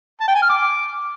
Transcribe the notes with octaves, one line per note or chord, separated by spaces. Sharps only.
A5
G5
G#5
F6
D6